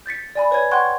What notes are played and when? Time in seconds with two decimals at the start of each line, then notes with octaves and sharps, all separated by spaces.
0.06 G6 A6 B6 C#7
0.35 D5 G#5 B5
0.51 B4 C#5 G#5 G#6
0.71 F#5 G5 C6 C#6 F#6 G#6